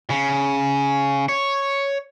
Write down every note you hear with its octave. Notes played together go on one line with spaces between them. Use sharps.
C#3
C#5